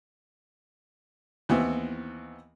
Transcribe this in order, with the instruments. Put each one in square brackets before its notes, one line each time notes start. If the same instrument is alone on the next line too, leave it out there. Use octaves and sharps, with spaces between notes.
[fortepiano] D#2 E3 B3 C4 E4